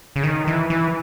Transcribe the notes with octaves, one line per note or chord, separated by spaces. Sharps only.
C#3
D#3
E3
E3